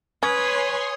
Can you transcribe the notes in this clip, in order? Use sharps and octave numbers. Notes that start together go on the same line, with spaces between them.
C#4 B4 C#5 G#5 C6 D#6 G#6